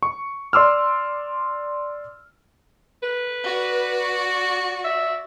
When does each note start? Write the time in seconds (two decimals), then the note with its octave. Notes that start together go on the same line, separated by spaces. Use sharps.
0.03 C#6
0.53 D5 C6 D6 E6 F6
3.03 B4
3.43 F#4 D5
4.84 E5